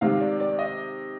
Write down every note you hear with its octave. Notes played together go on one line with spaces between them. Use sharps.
C3 D#3 G#3 F5
D5
D5
D#5